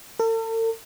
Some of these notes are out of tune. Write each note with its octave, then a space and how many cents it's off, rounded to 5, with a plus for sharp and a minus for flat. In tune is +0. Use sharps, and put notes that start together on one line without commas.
A4 +45